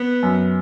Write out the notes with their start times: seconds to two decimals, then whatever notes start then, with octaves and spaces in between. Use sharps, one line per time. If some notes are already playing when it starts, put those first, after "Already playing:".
Already playing: B3
0.23 F#2